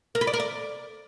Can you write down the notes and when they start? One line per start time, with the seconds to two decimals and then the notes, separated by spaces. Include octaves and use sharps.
0.15 A#4
0.21 B4
0.27 D5
0.33 A#4
0.40 D5